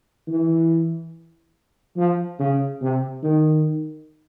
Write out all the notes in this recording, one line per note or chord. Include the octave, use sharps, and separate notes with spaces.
E3
F3
C#3
C3
D#3